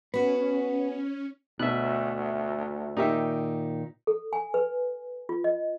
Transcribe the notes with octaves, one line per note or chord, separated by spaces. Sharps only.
B3 C#4 F#4 B4
D2 B2 E5 F#6
A#2 D#3 D#4 G4 E5
A4
G#5
B4
F4
D#5